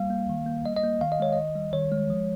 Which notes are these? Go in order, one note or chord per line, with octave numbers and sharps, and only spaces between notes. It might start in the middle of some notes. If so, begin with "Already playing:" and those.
Already playing: G3 A#3 F5
A#3
D#3
A#3
G3 D#5
D#5
A#3
D#3 F5
D#5
G#3 C#5
D#3 D#5
G3
D#3 C#5
G#3
F3